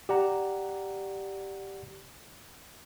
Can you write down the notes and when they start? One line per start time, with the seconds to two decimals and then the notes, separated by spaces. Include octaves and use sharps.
0.09 G4 D5 F#5 A#5